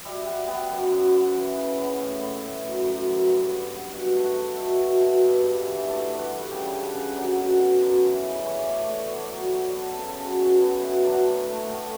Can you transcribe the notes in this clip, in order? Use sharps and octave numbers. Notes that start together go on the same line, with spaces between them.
G3 E5
G3 F#5
B3 G5
F#2 F#5
F#2
B3
E3
C#3
B3
A2 E5
B3
A2
F#2
F#2
F#2
G2 F#5
G2
B3
B2 F#5
A3
F#5
A3
B2 E5
B2
B2
G2
G2
E3
A3 D5
G2
F#5
G2
C#3 G5
C#3
F#5
C#3
F#3 D5
B2
B2
F#2
E3
C#3
E3 C#5
D5
A3 C#5
D5
A3 C#5
D5
B3 C#5
D5
F#3 C#5
D5
F#3 C#5
B3 A4
C#3 A4
A4
C#3 F#4
B2 F#4
B3
E4
B2
F#3 D4
A2
A3
A2